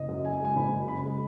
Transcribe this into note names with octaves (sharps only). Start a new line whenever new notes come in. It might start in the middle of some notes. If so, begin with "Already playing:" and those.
Already playing: F#1 D#5
F#2
C#3 G#5
G#3 G#5
F#1 B5
F#2
C#3 B5
G#3